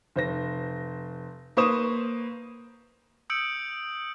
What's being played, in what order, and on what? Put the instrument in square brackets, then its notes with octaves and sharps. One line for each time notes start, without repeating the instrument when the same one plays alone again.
[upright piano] F1 C5 A#6
A#3 B4 C5 C#6 D#6 E7
[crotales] D#6 E6 G6 C#7 D7 F#7